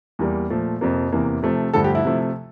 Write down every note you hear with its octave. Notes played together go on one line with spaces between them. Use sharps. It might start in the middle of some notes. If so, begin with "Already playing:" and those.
E2 E3 G3 A#3
A#2 F3 A3
F2 C3 F3 A#3
E2 C3 E3 A#3
C3 F3 A3
G2 D3 F3 A3 A4
G4
E4
C3 F3 A3